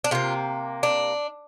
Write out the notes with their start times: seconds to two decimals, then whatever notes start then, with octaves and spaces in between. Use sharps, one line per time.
0.04 D4
0.11 C3 A#3 F4
0.83 D4